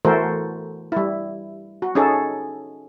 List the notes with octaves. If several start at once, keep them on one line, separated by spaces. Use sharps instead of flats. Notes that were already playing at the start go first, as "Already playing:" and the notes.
E3 A3 F#4 A4 A#4 C5
G3 E4
F#4
C#4 D#4 G#4 A4